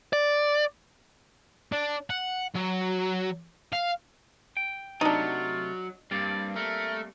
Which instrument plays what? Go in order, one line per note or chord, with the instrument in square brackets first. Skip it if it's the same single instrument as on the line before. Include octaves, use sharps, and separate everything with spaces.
[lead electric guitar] D5
[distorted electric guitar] D4
F#5
F#3
F5
[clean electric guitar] G5
[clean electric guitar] C3 A3 [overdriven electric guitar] F#3 [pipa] D4 D#4 [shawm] F4
[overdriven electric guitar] G2 [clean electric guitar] G3 A#3 C4 [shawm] D5
[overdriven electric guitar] A3 [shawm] A#4